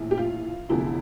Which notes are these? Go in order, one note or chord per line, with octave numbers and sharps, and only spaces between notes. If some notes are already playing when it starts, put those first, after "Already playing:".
Already playing: A#1 A2 E3
G4
F4
F1 E2 D3 F3 E4